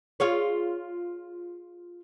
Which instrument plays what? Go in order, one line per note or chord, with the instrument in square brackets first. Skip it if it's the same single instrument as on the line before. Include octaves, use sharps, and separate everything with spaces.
[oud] F4 G#4 C#5